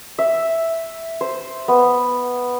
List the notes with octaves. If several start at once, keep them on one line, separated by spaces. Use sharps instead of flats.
E5
C5
B3